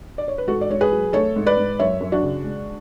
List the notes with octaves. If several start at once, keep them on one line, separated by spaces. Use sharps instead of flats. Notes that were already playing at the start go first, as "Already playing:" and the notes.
D5
C#5
B4
G#2 F#4 A4
D5
G#2 C#5
G#4 B4
F#3
A3 A4 C#5
G#2
B4 D5
G#2
F#2 C#5 E5
F#2
D4 F#4
C#3
G#3